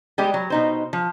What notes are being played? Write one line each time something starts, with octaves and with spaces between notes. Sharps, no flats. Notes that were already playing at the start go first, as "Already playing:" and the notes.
G3 G#3 B3 G4
F#3
B2 D#4 C5
F3